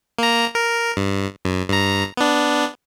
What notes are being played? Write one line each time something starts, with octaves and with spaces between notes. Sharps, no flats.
A#3 A#5
A#4
G2
F#2
G2 A#5
B3 D4